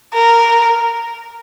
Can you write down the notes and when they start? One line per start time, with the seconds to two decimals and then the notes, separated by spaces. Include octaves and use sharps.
0.14 A#4